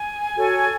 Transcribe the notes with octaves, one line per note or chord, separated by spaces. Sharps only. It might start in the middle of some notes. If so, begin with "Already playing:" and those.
Already playing: G#5
F#4 A4 C#5